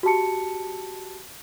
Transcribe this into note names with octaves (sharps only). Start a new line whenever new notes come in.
F#4 G4 A5 C#7